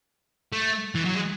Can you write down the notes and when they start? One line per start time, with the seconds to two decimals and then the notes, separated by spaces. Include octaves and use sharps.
0.52 A3
0.95 E3
1.05 F#3
1.15 G#3